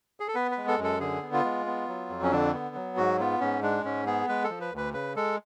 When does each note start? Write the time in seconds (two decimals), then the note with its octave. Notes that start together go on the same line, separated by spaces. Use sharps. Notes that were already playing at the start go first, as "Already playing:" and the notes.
0.20 G#4
0.28 A4
0.35 B3 B4
0.51 B4
0.58 G#3
0.68 A4
0.78 F#2
0.84 A4
1.00 D3 G#4
1.22 B3
1.33 F4
1.45 G#3
1.66 B3
1.88 F#3
2.10 F2
2.23 C#4
2.32 D3 D4
2.54 B3
2.75 F#3
2.97 G#2 F#4
3.20 B3 F4
3.40 G#2 C#4
3.62 G#3 D4
3.85 G#2 C#4
4.06 B3 G#4
4.28 G#3 B4
4.44 A4
4.50 F3
4.61 B4
4.73 D2 B4
4.93 C#3 B4
5.16 G#3 A4